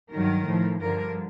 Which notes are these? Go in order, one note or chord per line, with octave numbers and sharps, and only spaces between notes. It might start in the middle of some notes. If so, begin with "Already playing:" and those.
G2 D#3 F#3 A#4
A2 F3
G2 D3 F3 A#4